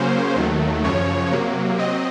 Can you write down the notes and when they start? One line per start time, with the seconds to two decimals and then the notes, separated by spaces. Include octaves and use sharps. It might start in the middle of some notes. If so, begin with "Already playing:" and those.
Already playing: C#3 F#3 A#3 C#4 C5
0.36 D#2 D#3 F#3 A3
0.84 F#2 C#3 F3 C#5
1.31 C3 F#3 A#3
1.78 F#3 C4 D#5